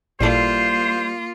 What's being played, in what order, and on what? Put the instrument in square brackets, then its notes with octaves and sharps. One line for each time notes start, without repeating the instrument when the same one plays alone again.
[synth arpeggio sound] A1 A#2 [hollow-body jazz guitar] G3 E4 A4 [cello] A#3 F4 [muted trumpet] C5